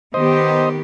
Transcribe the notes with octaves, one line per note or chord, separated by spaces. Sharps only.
D#3 B3 G4 C5 D#5